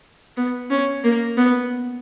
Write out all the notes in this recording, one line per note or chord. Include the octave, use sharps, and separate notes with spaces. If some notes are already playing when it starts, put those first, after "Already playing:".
B3
C#4
A#3
B3